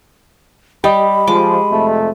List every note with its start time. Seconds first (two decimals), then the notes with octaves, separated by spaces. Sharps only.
0.84 G3 G4 D#5 B5
1.27 F3 G#3 D6
1.70 F2 C3 A3